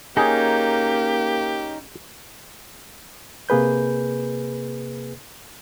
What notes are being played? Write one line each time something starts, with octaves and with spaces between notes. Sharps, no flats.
A#3 C#4 D#4 G4 G#4
C3 A#3 G#4 B4 G6